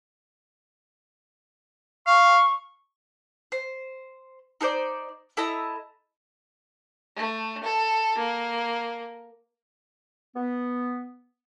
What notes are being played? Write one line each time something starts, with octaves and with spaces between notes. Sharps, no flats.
F5 C#6
C5
D#4 A4 C5 D5
E4 A4 D#5 A#5
A3
A4
A#3
B3